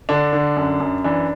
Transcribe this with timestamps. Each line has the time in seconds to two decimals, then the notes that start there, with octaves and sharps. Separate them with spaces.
0.09 D3 D4
0.33 D3
0.57 F#2
0.80 F#2
1.04 E3 D4